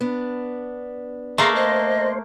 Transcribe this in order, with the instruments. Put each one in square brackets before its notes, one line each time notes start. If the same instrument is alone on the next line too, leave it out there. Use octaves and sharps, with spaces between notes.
[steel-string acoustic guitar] B3 D4
[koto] A3 A#3 [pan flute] G#4 [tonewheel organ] A#5 C6
[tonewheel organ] C5 [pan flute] D#5